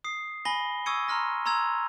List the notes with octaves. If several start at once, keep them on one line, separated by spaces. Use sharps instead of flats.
D#6 C7
G#5 B5 A#6 G7
C#6 D#6 E6 G#6 C#7 D#7
A#5 C6 F6 A#6
A#5 C6 E6 G#6 F7